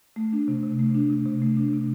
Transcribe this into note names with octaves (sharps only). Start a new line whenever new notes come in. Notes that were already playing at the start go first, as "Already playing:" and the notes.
A3
D4
C3
C3
A3
D4
C3
C3
A3
D4
C3